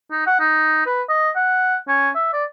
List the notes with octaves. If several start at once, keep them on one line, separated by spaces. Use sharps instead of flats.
D#4
F#5
D#4
B4
D#5
F#5
C#4
E5
D5